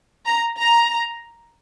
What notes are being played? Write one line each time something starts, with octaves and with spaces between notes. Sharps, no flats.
A#5
A#5